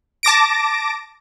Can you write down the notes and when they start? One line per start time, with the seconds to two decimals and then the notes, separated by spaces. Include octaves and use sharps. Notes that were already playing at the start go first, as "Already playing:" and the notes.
0.23 A5 D6 A#6 D7